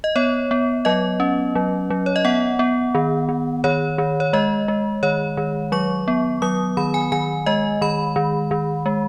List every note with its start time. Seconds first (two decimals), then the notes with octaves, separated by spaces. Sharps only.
0.04 D#5
0.16 B3 C#5
0.51 B3
0.85 F#3 D#5
1.20 C#4
1.55 F#3
1.90 F#3
2.06 C#5
2.16 D#5
2.25 B3 F#5
2.59 B3
2.95 D#3
3.29 D#3
3.64 D#3 C#5
3.98 D#3
4.20 C#5
4.33 G#3 D#5
4.68 G#3
5.03 D#3 C#5
5.37 D#3
5.72 F#3 C#6
6.08 B3
6.42 F#3 D#6
6.77 D#3 B5
6.94 G#5
7.12 D#3 G#5
7.46 G#3 D#5
7.81 D#3 B5
8.16 D#3
8.51 D#3
8.86 G#3